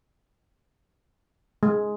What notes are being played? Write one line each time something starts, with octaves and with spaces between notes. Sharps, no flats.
G#3